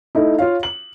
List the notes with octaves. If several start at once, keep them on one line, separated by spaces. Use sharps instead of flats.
A3 D#4 E4
F4 C#5 F5
F#7